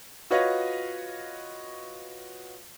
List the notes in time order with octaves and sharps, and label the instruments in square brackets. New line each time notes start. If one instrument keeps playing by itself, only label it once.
[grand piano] F4 F#4 B4 C#5 D#5 F5